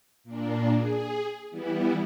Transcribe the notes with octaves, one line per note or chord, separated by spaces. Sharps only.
A#2 A#3 D4
G#4
E3 G3 B3 E4